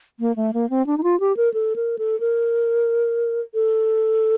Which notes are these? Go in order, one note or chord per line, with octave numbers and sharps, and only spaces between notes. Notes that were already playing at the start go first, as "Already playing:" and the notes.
A#3
A3
A#3
C4
D4
D#4
F4
G4
A#4
A4
A#4
A4
A#4
A4